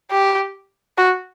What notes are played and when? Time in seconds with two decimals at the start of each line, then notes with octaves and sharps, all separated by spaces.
0.11 G4
0.98 F#4